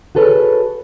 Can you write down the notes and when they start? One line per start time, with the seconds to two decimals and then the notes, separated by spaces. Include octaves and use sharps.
0.15 F#4 G#4 A4 B4 C#5